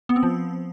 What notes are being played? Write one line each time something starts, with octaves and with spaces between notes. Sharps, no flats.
B3
C4
F3